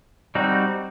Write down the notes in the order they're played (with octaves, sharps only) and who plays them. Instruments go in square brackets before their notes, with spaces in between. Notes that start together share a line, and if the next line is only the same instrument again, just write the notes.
[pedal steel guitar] G3 C4 D#4 F#4